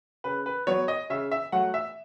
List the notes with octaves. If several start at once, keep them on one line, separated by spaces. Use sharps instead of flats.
C#3 B4
B4
F#3 B3 C#5
D#5
C#3 E5
E5
F#3 A3 F#5
E5